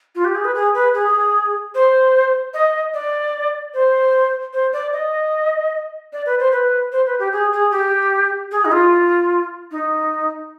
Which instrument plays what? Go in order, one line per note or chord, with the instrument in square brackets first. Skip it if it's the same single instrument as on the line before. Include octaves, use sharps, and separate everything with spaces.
[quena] F4
G4
G#4
B4
G#4
B4
G#4
C5
D#5
D5
C5
C5
D5
D#5
D5
B4
C5
B4
C5
B4
G4
G#4
G#4
G4
G#4
D#4
F4
D#4